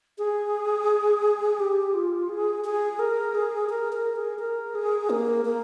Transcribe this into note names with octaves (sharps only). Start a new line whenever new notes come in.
G#4
G4
F4
G#4
G#4
A#4
G#4
A#4
A#4
G#4
A#4
G#4
A#3
A#3